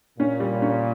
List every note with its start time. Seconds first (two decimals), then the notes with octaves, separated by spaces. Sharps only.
0.19 A#2 C#4
0.40 G3
0.62 C#4